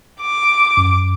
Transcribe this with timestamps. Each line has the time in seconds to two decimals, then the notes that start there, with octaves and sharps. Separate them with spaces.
0.21 D6
0.77 F#2